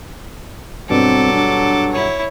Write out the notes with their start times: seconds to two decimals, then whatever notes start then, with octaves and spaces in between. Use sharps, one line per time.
0.90 G2 B2 F#3 G3 C4 A4 D6
1.34 D4
1.92 E4 C#5